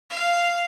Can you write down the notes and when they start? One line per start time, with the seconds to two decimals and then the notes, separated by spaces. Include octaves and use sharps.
0.10 F5